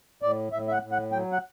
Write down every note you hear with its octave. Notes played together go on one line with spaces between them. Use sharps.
A2 D5
A2 E5
E5
F#5
A2
F#5
F#3 G5
F#5